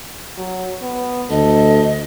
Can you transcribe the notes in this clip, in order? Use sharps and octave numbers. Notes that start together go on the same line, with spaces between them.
F#3
B3
D2 A4 D#5